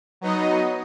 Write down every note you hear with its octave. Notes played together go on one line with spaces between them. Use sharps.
F#3 B3 D#4 D#5